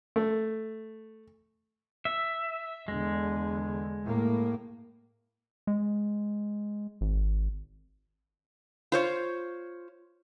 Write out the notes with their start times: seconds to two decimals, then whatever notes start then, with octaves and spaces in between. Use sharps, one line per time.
0.16 A3
2.05 E5
2.88 E2 D3 G#3
4.05 A2 A#3
5.67 G#3
7.01 G#1
8.92 F4 C5 C#5